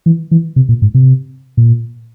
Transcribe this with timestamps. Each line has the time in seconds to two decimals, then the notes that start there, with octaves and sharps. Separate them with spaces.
0.06 E3
0.31 E3
0.56 C3
0.69 A#2
0.82 G#2
0.94 C3
1.57 A#2